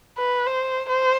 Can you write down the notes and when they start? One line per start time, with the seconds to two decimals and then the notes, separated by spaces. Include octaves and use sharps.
0.18 B4
0.46 C5
0.89 C5